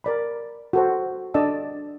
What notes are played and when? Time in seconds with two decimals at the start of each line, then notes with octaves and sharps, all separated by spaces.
0.04 A#4 D5 B5
0.73 F#4 A4 C5
1.34 D4 A4 D5 D#5 A5 E6